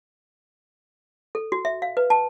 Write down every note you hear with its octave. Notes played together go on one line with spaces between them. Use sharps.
A4
F#4
E5
F5
B4
A5